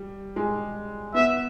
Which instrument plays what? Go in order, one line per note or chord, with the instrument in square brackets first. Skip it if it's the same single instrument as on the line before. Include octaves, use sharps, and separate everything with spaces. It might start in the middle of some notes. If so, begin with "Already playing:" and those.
Already playing: [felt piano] G3
G#3
[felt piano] B3 [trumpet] E5